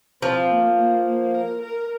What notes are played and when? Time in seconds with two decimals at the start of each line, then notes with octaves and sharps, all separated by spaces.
0.22 F3 C4
0.50 A#3
0.78 A#3
1.06 A#3
1.34 A#4
1.62 A#4